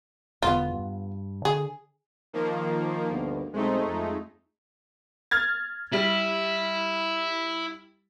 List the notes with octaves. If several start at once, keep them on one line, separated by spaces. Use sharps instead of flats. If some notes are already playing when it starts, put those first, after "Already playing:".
E1 E2 D3 B3 F4
G2
D3 G#4
D#3 F3 A#3
D2 G2 B3
B1 G#3 A3 C4 D#4 C5
F2
F6 G#6 A6
G3 E4